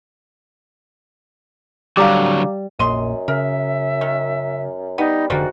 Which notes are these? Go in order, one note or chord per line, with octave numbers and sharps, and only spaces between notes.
D3 F#3 G3 F5 A#5 D6
F1 A#1 F#2 A#2 D#5 C6
C#3 A#4 E5
D#3
G3 B3 D#4
F1 G#2 D3 F3 G3 A#3 F#4